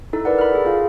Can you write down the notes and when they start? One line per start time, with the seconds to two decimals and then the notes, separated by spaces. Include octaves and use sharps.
0.13 D#4 E4 A4
0.25 A#4 B4 D5 F#5
0.38 B5 F6
0.52 G#4 A4
0.65 F4 G#4 F5